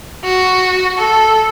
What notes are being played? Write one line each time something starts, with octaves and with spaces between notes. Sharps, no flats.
F#4
A4